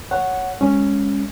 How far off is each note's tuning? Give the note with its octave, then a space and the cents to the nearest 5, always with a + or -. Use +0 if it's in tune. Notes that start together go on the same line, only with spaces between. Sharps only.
C#5 +0 F#5 +0
G#3 -20 C#4 +0